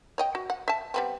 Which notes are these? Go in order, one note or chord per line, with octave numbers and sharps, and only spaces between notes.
C#5 D#5 G5
F#4
F#5
E5 A5
G3 B3 C4